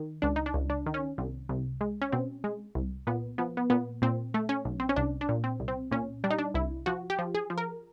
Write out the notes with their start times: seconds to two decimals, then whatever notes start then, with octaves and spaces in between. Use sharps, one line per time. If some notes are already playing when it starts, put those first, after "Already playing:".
Already playing: D#3
0.22 C#2 D4
0.36 D#4
0.46 D4
0.54 C#2
0.70 D4
0.86 D#3
0.94 C#4
1.18 C2
1.49 C2
1.81 G#3
2.02 C#4
2.12 B2 C4
2.44 G#3
2.75 C2
3.07 A#2 B3
3.38 F3 B3
3.57 B3
3.70 A#2 B3
4.02 A#2 C4
4.34 A3
4.49 C#4
4.65 B1
4.80 C4
4.89 C#4
4.96 C2 D4
5.21 D4
5.29 A#2
5.44 C4
5.60 C2
5.68 C4
5.91 A#2 C#4
6.24 G3 D4
6.30 D#4
6.39 D4
6.54 C2 E4
6.86 F3 F#4
7.10 G4
7.19 F3
7.35 G#4
7.50 F3
7.58 A#4